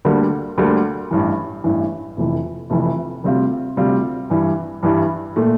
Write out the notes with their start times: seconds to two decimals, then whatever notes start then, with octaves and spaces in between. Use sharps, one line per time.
0.05 D2 D3 G3 A#3
0.58 D2 D3 G3 A#3
1.11 A1 G2 E3
1.64 A1 G2 E3
2.17 F1 F2 E3
2.70 F1 F2 E3
3.24 D2 C3 G3 C4 F4
3.77 D2 C3 G3 C4 F4
4.30 G2 E3 G3
4.83 G2 E3 G3
5.36 A#2 A3